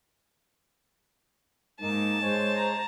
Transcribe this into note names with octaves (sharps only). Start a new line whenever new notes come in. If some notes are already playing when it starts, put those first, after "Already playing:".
G#2 A#3 D#4 A5
G#3 C5 C#5 G#5
A#5